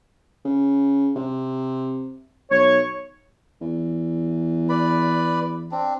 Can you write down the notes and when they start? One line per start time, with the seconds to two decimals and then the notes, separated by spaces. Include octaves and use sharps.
0.45 C#3
1.16 C3
2.51 B1 C#5
3.61 E2
4.69 B4 D5 B5
5.71 C4 D4